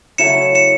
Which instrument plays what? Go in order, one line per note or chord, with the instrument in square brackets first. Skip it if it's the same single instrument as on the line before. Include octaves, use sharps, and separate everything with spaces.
[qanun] C#3 F#3 A3 E4 [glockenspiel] C#7 E7
[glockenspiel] C#7 E7